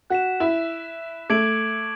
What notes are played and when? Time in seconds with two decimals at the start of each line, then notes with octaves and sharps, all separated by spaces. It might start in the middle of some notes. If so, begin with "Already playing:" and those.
0.10 F#4 F#6 B6 E7
0.40 E4
1.30 A3 D6 G#6 D7 F#7